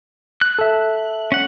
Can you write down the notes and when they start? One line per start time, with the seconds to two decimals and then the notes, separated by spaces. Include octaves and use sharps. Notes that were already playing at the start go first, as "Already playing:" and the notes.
0.41 F#6
0.59 A4 E5
1.32 C#4 F#5